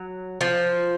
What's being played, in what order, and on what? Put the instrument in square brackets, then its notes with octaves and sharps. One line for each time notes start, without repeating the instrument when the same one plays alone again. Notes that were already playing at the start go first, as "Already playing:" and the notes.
Already playing: [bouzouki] F#3
F3